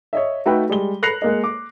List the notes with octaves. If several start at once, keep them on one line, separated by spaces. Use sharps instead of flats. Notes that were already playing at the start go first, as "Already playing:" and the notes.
C#5 D#5 E5
A3 D#4 F#4 A4 B4 G5
G3 G#3 G7
B5 F#6 A#6 C7 C#7 F7
G#3 A#3 D#5
D6